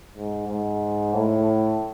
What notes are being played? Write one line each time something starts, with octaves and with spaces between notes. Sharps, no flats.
G#2
G#2
A2